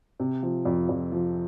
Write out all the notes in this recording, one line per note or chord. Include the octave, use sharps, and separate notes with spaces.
C3
F3
F2
F2
F3